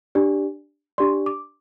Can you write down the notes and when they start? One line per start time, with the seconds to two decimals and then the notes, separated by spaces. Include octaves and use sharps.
0.15 D4 G4 D5
0.98 D4 G4 D5 C6
1.26 D6